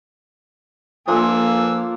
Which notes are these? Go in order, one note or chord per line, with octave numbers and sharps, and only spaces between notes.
F3 A#3 D4 F4 A4 G#5 E6